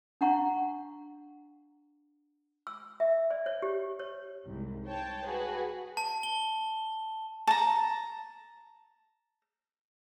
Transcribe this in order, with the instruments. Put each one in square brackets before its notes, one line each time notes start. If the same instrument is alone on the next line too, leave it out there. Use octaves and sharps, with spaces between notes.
[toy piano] D4 F5 F#5 A#5 C#6
E6
E5
D5
C#5
G4
C#5
[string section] C2 G#2
C5 C#5 G5 A5
F#4 G#4 B4
[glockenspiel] A5
G7
[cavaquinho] A5 A#5